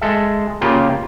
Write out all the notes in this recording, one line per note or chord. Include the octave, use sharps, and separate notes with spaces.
G#3 A4 E5
C#3 A#3 F4 G4